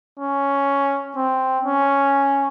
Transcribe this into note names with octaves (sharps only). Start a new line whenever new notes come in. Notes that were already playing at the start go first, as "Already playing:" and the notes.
C#4
C4
C#4